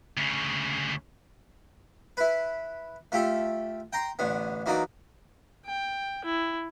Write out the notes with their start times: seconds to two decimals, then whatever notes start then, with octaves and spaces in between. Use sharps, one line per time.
0.17 D2 C#3
2.17 E4 B4
3.12 A3 F4 G4 A4
3.93 G5 A#5 C6
4.19 A1 D3 B3
4.66 E2 F#3 A#3 D#4 D5
5.65 G5
6.25 E4